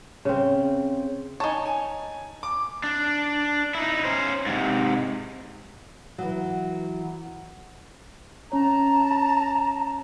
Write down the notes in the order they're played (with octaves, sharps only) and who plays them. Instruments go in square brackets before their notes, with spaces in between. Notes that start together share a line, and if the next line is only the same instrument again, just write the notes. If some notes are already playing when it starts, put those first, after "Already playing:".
[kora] C#3 C4
[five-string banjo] D#4 C#5 [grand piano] G#5 A5
[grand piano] G#5
D6
[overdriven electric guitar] D4
D#4 E4
C#4 C5
G#2 C3
[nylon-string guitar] E3 F#3
[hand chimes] C#4 C#5 [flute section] A5 A#5